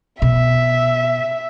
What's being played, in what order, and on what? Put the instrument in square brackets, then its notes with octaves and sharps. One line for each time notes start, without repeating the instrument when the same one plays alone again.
[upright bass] B2 [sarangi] E5